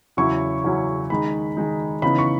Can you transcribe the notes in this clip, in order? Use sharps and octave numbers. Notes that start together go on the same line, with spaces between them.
E2 C#3 F#3 C#4 E4 C#6
E2 C#3 F#3 C#4 E4
D#3 G#3 D#4 B5
D#3 G#3 D#4
C#3 E3 B3 D#4 B5
C#6